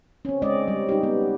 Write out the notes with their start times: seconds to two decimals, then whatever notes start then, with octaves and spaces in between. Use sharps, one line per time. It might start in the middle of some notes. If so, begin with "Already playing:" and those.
0.25 C4 C#4
0.42 G#3 C4 C#4 D5 D#5
0.68 G3
0.89 D#4 G4
1.03 B3